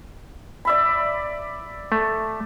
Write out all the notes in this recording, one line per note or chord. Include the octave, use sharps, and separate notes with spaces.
D5 E5 B5
A3